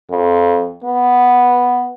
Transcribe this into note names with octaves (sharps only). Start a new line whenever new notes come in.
F2
B3